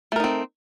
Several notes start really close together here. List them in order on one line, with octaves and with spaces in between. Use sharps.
A3 A#4 D#4 C4